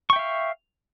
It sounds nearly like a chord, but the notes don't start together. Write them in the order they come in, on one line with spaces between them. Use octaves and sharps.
C#6 G5 E5 F5